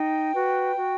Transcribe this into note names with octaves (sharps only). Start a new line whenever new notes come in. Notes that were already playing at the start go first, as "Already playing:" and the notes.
Already playing: D#4 G5
F#4 B4
F#4